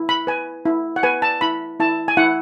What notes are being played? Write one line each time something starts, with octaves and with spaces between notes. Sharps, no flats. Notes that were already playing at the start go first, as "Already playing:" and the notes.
Already playing: E4
B5
B4 G#5
E4
F#5
B4 G#5
A5
E4 B5
E4 A5
G#5
E4 F#5